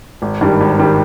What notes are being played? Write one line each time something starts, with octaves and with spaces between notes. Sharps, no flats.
G#1
G2 D#3 G3
G#1
D#3 G3